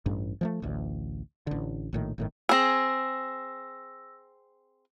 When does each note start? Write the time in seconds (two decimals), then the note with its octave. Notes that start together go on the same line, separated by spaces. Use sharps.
0.06 A1 G2
0.41 F3 G#3 A3
0.62 A1 D2
1.47 A1 D3
1.93 A#1 A2 D#3
2.18 G1 A2 D#3
2.49 C4 G#4 E6 A#6